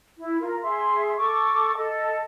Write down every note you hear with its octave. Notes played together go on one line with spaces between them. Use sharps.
E4
F4 A#4
G#4 E5 C6
A4 C#6 D6
A4 D#5